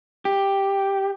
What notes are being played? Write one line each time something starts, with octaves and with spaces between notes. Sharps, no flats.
G4